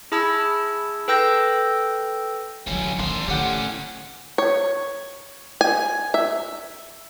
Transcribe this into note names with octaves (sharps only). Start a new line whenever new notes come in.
E4 G#4 A5 B5 E6 G#6
A4 B4 G5 E6 G6 A#6
D3 E3 F#3 C#4
D#3 D4 F4
A2 D3 C#4 G4 F#5
C#5
G#5
E5